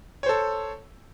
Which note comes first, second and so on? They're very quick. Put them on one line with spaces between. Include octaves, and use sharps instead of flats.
C#5 C5 A4